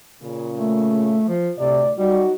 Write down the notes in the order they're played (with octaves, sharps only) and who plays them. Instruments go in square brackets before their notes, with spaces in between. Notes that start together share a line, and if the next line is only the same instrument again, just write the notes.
[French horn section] A#2 C#3
[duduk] A3
F3
[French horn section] D2 A2 D5 [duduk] C3
[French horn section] F#3 D#4 F#4 [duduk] G3